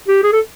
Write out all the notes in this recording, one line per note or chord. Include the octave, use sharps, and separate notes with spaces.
G4
G#4
A4